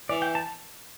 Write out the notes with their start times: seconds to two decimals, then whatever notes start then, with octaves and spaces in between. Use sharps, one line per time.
0.09 E3 D5
0.22 G5
0.35 A5